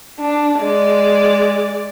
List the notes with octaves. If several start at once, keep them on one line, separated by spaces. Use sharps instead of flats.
D4
G#3 D5